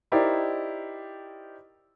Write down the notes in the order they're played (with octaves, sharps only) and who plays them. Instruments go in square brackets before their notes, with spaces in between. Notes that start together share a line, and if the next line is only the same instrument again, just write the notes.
[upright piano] D#4 E4 G4 A#4 C5 D5